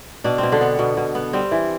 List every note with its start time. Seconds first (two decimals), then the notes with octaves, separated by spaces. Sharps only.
0.24 B2 D4
0.38 C4
0.43 B2
0.52 D3 D4
0.61 B3
0.79 B2
0.97 B2
1.15 B3
1.33 G3 C4
1.51 E3